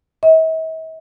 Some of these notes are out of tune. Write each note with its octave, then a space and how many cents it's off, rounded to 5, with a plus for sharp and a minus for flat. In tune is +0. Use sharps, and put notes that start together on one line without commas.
E5 -45